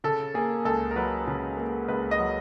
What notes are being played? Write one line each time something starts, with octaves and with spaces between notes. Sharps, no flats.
C#3 A4
A#3 G#4
C#2 A4
A#4
F#3 B4
C#3
A#3
C#2 B4
D#5
F#3